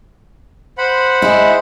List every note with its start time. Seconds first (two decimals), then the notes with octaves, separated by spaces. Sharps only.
0.78 C5 F#5 B5
1.22 G#3 E4